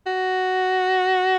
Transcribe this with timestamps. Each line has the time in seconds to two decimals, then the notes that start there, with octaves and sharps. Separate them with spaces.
0.07 F#4